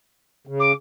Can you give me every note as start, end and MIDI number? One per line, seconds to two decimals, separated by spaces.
0.47 0.72 49
0.60 0.72 86